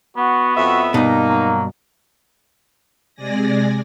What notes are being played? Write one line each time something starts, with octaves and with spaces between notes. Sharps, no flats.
B3 F#4
F2 F#4 E5
G2 B2 A#3 D#4
F#3
C3 G#3 D5 G#5 A#6